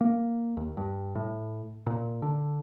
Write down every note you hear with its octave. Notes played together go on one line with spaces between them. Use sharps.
A#3
D#2
G2
A2
A#2
D3